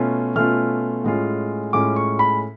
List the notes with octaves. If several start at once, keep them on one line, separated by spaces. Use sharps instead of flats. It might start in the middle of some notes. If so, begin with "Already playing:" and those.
Already playing: B2 A3 C#4 F4
B2 A3 C#4 F4 F6
A2 G#3 C#4 F4
A2 G#3 C#4 F4 D6
C#6
B5